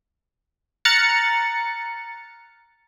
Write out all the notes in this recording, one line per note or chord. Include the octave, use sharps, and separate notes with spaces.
A#5 F6 F#6 A6 C#7